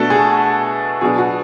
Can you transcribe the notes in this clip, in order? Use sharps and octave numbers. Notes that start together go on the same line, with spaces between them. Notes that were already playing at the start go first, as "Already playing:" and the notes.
Already playing: B2 A3 D4 F#4 A4
G#4
B2 F#3 B3 D4 G#4
F#4